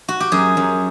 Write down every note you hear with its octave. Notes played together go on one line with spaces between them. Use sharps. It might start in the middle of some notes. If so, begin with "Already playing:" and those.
F#4
G4
F#2 G#4
F#2